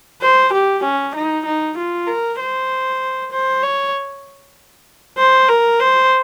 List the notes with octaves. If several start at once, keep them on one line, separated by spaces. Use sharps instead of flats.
C5
G4
C#4
D#4
D#4
F4
A#4
C5
C5
C#5
C5
A#4
C5